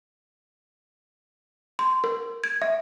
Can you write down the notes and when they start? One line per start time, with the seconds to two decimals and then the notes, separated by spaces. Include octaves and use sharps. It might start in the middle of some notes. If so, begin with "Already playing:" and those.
1.79 C6
2.04 A#4
2.44 G#6
2.62 E5